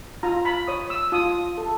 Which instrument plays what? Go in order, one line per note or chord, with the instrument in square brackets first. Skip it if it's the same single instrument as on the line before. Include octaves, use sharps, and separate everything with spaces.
[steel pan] F4 A#5
B5
C#5 D#6
E6
F4 D#6
A4